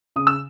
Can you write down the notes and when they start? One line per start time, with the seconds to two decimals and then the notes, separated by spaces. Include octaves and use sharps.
0.16 C#3 D#6
0.27 E6